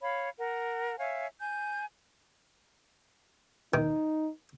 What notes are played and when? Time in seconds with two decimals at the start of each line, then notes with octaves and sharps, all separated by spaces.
0.01 C#5 F5 B5
0.39 A#4 F#5
0.98 C#5 E5 F5 G#5
1.40 G#5 G6
3.74 D#3 D#4